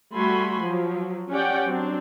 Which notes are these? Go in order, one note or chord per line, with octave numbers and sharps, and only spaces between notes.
G3 A3 F#4 G#5 B5 C6
F3 F#3
C#4 G4 D5 F#5 G5
F#3 C4 D4